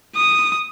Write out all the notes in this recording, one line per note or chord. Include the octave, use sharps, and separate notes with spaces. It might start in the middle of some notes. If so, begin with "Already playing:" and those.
D#6